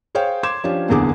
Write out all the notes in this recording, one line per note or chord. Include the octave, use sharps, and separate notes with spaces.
G#4 C5 C#5 F5 G5
C6 D6 G#6 E7
F3 C#4 D4 F4 G4
F#1 B1 E2 D3 G#4 D6